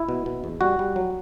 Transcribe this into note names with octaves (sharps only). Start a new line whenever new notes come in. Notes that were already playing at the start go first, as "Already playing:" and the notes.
Already playing: E4
B2
B2
E2
G3 F#4
G3
F#3